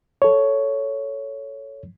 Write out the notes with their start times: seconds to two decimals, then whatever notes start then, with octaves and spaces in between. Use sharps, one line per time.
0.22 A4 C#5